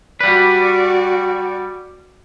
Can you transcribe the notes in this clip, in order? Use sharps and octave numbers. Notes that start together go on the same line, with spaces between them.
G3 F#4 B4 D5